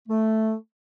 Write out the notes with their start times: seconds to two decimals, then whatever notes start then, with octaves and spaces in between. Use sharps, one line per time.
0.08 A3